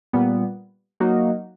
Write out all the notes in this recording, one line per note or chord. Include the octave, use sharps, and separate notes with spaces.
A#2 G3 B3
F#3 A#3 D#4 F#4